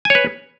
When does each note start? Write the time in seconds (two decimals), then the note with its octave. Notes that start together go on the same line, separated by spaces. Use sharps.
0.05 G#5
0.10 C#5
0.15 B4